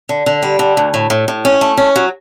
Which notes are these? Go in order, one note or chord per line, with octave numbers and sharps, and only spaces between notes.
D3
D3
G3
D3
D2
A2
A2
A2
C#4
A3
C#4
F#3